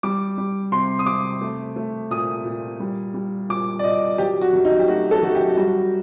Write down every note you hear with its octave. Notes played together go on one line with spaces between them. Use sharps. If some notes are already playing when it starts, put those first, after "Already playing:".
G3 D6
G3
C3 C6
D#6
C3 D6
A3
A3
A#2 D#6
A#2
G3
G3
A#2 D6
D5
A#2 D#5
F#3 G4
F#4
F#2
D#4
G4
A3 F#4
A4
F#2 F#4
G4
G3 F#4